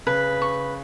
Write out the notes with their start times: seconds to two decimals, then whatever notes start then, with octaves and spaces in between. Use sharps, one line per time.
0.06 C#3 B4
0.42 C#6